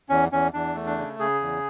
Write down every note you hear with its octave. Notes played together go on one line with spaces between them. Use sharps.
E2 C#4
E2 C#4
E2 D4
A3
D4
C#3
C#3 G#4
E2